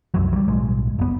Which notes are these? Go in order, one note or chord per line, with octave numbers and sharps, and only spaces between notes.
C2 F#2 F#3
F#3 G3
D1 B1 G#3
F#1 B3